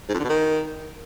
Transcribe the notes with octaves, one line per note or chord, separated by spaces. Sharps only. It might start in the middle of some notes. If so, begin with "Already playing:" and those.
G#2
F2
D3
B2
D#3